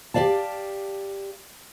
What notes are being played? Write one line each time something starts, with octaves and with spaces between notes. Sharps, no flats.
G4 G#4 D5 F5 A5